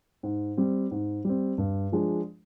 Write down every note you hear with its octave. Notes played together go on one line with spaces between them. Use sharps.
G#2
G3 C4
G#2
G3 C4
G2
F3 G#3 D4